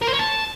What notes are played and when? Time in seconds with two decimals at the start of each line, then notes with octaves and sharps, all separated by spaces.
0.01 A#4
0.07 C5
0.13 C#5
0.19 A5